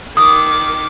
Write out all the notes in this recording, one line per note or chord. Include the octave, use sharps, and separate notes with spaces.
D#3 D6 D#6